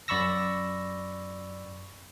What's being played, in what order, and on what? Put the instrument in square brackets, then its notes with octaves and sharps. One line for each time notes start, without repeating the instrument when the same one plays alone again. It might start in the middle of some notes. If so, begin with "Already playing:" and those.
[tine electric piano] F#2 D5 B5 C#6 E6 A#6